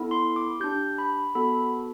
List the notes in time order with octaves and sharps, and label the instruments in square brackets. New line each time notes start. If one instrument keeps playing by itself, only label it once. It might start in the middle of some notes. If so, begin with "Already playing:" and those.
Already playing: [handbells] B3 E4 A4
C6
D6
D4 G4 G6
B5
B3 F#4 A4 B5